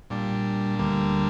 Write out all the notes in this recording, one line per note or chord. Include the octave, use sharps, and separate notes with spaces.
A#2 G3 D4
D2 D3 G3 A#3